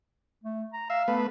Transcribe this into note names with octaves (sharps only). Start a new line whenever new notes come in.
A3
A#5
E5 F5
A3 B3 B4